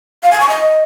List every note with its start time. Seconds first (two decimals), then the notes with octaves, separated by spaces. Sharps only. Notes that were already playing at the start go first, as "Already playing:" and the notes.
0.23 F5
0.32 G#5
0.40 C#6
0.49 D#5